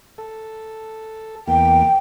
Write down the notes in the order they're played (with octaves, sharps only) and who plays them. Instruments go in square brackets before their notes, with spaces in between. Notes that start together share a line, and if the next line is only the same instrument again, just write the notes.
[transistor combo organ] A4
[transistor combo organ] E2 A#3 [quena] G5